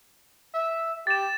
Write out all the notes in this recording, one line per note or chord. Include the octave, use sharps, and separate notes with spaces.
E5
G4 A6 E7